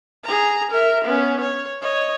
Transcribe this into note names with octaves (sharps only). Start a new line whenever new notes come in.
G#4 A#5
A#4 E5
B3 C#4
C#5
C#5 D#5